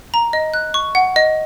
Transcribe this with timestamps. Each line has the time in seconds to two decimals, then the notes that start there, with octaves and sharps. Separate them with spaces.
0.14 A#5
0.33 D#5
0.54 F#6
0.74 C#6
0.95 F#5
1.16 D#5